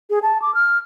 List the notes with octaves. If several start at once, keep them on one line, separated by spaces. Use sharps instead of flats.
G#4
A5
D6
F6